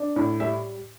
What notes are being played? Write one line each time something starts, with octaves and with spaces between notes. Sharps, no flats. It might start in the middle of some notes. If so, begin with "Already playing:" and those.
Already playing: D4
A2
G3 E5